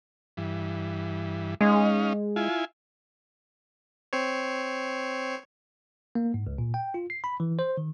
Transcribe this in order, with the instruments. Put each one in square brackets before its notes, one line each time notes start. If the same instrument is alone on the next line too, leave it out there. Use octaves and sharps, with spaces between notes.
[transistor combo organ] G2 E3
[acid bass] G#3 [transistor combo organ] C#4 D#4 F5
[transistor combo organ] E4 F4 G#5
[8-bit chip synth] C4 C5 C#5
[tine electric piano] A#3
G#2
C#2
A#2
G5
F4
C7
B5
E3
C5
D#3